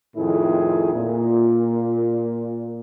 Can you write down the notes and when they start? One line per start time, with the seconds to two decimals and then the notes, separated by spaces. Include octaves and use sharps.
0.16 F2 A2 D#3 E4 G#4
0.93 A#2